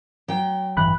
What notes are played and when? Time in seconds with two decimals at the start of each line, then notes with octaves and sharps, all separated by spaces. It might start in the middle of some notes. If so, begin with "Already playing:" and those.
0.28 F#3 G5
0.77 A1 G2 E3 B5 F#6